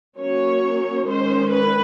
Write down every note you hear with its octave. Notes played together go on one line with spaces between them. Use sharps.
F#3 A#3 C#4 C#5
D#3 G#3 C#4 C5
B4